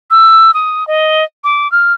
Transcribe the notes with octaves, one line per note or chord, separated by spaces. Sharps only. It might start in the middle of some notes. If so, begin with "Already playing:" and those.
E6
D#6
D#5
D6
F6